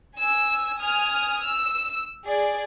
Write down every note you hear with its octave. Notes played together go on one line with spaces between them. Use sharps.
G#5 E6
G#5 D#6 F6
E6
G#4 D5